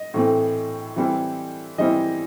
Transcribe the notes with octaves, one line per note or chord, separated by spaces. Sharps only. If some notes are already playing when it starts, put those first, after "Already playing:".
Already playing: D#5
A2 E3 A3 C4
E3 G3 C4 E4
E3 G3 C4 E4 D#5